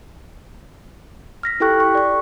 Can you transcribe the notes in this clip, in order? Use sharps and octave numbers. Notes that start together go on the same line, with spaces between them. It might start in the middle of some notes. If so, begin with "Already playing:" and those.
F6 A#6 B6
E4 G4 A4 G5 C#6 F#6
C#6
D5 C#6